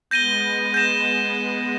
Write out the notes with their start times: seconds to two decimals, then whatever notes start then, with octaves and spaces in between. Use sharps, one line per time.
0.10 G#3 B3 G6 A#6 D#7 G7
0.43 G#3 B3
0.74 G6 A#6 E7